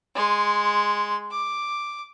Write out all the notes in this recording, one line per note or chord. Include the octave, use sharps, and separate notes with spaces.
G#3 C6
D6